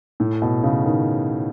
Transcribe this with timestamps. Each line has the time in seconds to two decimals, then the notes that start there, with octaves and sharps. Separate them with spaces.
0.20 A2
0.42 B2
0.63 C#3
0.85 D#3